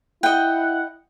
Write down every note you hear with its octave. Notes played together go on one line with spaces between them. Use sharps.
E4 D#5 F#5 G5